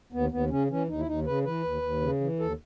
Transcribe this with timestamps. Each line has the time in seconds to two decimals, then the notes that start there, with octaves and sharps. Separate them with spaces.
0.12 D#2 B3
0.32 D#2 B3
0.50 C#3 C#4
0.70 E3 C#4
0.88 D#2 D#4
0.98 E4
1.07 D#2 D#4
1.26 C#3 B4
1.44 E3 B4
1.64 D#2
1.82 D#2
2.01 C#3
2.21 E3
2.39 D#2 A4